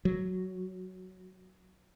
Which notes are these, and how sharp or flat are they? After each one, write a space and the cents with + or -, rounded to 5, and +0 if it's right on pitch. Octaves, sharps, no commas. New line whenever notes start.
F#3 +5